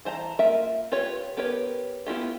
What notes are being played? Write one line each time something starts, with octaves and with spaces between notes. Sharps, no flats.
E3 C5 A5 A#5
A#3 F4 A#4 E5
F4 G4 B4 C#5
B3 G4 A#4 B4 C#5
B3 E4 F4 G4